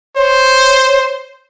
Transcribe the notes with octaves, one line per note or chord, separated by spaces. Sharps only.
C5 C#5